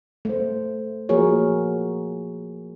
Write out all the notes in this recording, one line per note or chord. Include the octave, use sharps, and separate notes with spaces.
A3 C5
F3 A#3 F#4 G#4 A#4 C#5